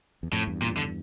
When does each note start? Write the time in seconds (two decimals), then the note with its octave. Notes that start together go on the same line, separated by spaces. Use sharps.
0.23 E2
0.32 F2 A2
0.47 E2 G2
0.62 A#2
0.77 D3